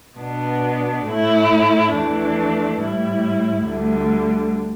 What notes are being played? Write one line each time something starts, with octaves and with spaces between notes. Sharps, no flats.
B2 B3 D4
A2 A3 E4
E2 E3 A3 D4
A2 G3 E4
D2 D3 G3